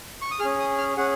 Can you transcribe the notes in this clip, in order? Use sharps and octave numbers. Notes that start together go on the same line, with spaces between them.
C#6
D#6
C#4 G#4 F6
D#6
F6
C#4 G#4 F#5